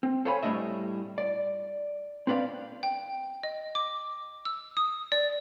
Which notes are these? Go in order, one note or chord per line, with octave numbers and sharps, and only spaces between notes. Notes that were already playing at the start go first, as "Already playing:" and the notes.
C4
A4 C5 C#5 F5 G#5 B5
A2 G3 A3 D4 D#5 E5
D5
C4 D4 B4 D5 F5
G5
D#5
D6
E6
D#6
D5